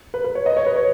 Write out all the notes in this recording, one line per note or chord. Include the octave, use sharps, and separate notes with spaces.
B4
B4
C#5
D#5
C#5
B4
C#5